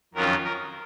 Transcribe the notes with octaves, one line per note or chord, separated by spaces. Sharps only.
F2 D#3 F#3 C#4 F4 A#4
A#4